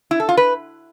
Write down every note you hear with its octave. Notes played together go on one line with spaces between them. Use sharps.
E4
A4
F4
B4